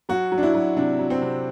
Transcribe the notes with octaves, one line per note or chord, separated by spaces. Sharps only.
F#3 F#4
F#3
D4
E4
F#3
C3 D4
F#3
C4
C3